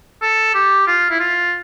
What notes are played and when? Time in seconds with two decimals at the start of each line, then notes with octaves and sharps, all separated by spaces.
0.22 A4
0.54 G4
0.87 F4
1.10 E4
1.19 F4